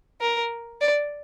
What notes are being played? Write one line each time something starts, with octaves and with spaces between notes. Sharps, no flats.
A#4
D5